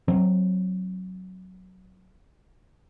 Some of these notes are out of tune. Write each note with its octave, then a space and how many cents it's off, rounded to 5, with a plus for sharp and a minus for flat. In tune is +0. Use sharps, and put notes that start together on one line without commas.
F#3 +5 C4 +20